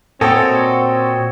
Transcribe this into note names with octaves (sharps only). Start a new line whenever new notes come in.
A#2 C4 F#4 A4 C#5 D#5 G5 G#5